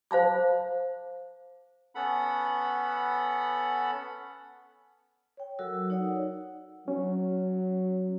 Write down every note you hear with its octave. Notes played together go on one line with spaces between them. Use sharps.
C5 F5 A5 D6
B3 C#4 A4 F#5 B5
C#5 G5
F#3 F#4 A4 A#4 E6
D#4 C#5 D5 F#5
F#3 C#4